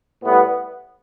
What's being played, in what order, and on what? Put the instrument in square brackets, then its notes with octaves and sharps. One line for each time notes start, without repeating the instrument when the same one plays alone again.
[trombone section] A2 G3 B3